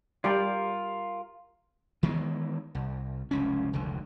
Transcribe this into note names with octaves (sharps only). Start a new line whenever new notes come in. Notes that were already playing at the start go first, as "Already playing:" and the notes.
G3 F4 G4 A#4 D5
D#3 E3 G#3 B3
C2
F1 C#2 C#4
F1 C#2 D3